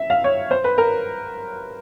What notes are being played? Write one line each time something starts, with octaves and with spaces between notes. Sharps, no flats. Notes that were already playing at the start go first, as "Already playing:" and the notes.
Already playing: E5
F5
C#5
C5
B4
A#4